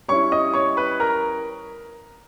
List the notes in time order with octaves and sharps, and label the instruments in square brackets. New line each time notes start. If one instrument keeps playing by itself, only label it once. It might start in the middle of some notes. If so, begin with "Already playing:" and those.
[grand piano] G3 C#4 E4 C#5 C#6
D#5 D#6
C#5 C#6
B4 B5
A#4 A#5